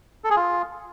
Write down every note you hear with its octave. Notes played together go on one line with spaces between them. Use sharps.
A4
G#4
F4